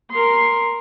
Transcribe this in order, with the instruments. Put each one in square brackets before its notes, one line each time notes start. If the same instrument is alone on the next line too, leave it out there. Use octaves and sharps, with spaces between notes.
[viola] A#4 C6